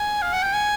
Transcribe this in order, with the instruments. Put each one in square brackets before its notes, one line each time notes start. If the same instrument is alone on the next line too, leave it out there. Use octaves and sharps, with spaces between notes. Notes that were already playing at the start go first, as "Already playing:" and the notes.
Already playing: [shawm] G#5
F5
F#5
G5
G#5